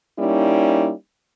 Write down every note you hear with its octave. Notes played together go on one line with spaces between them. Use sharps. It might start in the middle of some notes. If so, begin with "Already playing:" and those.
G3 A#3 C#4 D#4 E4